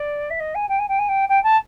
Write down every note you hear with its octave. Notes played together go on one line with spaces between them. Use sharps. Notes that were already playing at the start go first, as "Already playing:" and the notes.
Already playing: D5
E5
D#5
G#5
G5
G#5
G5
G#5
G5
G5
A5